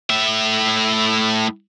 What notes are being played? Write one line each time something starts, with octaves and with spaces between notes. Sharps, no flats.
A2 E5